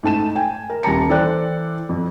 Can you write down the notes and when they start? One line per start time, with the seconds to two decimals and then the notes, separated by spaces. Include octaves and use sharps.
0.03 G#2 A3 A5 E7
0.35 G5 G#5
0.70 A#4
0.83 D#1 G3 A5 A#5 C#7
1.09 E3 A4 C5 D5 G5 F#6
1.89 F2